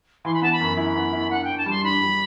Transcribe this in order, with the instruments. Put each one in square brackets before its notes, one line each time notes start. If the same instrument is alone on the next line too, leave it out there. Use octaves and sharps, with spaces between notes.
[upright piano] E3 [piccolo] C6
[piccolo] B5
[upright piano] B3 [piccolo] A5
[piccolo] B5
[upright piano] F#2
[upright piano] E4 [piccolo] B5
[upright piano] B3
E4
[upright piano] D4 [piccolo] F#5
[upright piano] D4 [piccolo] G5
[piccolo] A5
[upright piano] G3 [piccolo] C6
[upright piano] D4 [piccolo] B5
[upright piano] G3